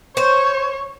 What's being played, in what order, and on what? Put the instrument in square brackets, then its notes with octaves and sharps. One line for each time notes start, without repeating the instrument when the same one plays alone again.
[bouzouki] C5 [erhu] C#5